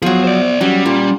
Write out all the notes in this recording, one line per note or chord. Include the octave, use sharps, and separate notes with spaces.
F3 F#3 B3 G#4
C5 D5
F#3 G3 C#4
A#2